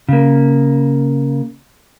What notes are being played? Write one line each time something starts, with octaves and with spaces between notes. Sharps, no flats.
C#3 A#3